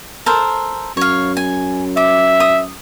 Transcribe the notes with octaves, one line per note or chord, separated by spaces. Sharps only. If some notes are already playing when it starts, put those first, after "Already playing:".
A4 A#4 C5
F#2 C#5 F5
G#5
E5 D6
D#6